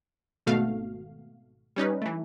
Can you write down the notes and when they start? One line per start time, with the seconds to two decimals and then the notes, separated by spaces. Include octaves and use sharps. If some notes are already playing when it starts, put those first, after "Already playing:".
0.46 G#1 B2 A3 F#4 F5
1.76 G3 C#4 D#4 B4
2.02 E3 A3